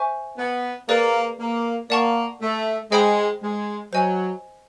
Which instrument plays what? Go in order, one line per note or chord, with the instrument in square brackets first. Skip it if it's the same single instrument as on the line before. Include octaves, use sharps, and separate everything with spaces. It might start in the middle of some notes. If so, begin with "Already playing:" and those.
Already playing: [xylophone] C5 E5 G#5 C#6
[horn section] B3
[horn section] A#3 [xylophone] G#4 B4 D5
[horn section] A#3
[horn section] A#3 [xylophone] D5 F#5 A5 C#6
[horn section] A3
[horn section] G#3 [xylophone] C5 D#5 G5 B5 D#6
[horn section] G#3
[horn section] F#3 [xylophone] C5 D#5 G#5